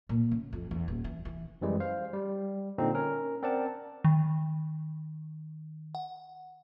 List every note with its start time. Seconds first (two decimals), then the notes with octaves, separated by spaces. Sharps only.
0.09 A#2
0.31 C#3
0.53 F2
0.71 E2
0.88 D#1
1.04 E3
1.25 E3
1.61 F#2 E3 G3 G#3
1.80 C5 F5
2.13 G3
2.78 A#2 D3 C4 D#4
2.94 C#4 A#4
3.43 C4 A#4 D5 F#5 A5
4.04 D#3
5.95 F#5